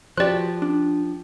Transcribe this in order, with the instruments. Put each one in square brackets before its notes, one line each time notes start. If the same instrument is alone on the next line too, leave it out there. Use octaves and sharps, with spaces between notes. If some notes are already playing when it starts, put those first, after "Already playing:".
[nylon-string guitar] F3 G4 [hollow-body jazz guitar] F#4 B4 C5 [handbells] D5 F#6
[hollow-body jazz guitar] D4